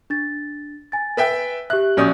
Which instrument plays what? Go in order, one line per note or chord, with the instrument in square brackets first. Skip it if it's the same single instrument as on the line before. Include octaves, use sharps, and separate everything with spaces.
[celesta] D4 A6
G#5 A6
[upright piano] B4 E5 G5
[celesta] G4 E5 [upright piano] F#6
[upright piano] A#1 C#4 D#6 [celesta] F#4 D5 G6